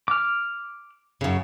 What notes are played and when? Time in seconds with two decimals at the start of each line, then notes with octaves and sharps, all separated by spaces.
0.08 D6 F6
1.21 F#2 C#3